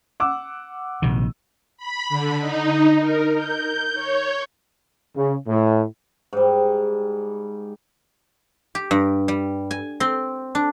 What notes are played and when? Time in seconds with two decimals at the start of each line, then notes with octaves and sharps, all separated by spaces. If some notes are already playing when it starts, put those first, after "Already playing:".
0.20 F#5 D6 E6
1.02 A#1 C3 D#3
1.77 B5
2.09 D3
2.40 D#4
3.01 A#4
3.36 G6
3.94 C#5
5.16 C#3
5.47 A2
6.33 G#2 G3
8.75 G4
8.91 G2
9.28 G3
9.71 G#5
10.00 C4
10.55 D4